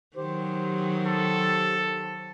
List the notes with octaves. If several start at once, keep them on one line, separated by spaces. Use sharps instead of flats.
D#3 F#3 G4 C5
A4